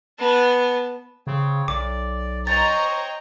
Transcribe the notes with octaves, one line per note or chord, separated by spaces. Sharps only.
B3 A5
C#3 C4 C#5
B1 D5 D6
C5 C#5 D#5 G5 A#5 C#6 A6 F7